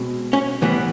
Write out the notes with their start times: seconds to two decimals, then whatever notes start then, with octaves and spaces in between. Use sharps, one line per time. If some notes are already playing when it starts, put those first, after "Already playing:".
Already playing: B2 G#3 C4
0.33 C#4
0.62 A2 E3 G3 B3